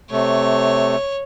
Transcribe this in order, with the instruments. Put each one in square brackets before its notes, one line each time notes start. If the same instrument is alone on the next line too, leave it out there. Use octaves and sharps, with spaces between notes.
[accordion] C3 A3 [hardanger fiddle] C#5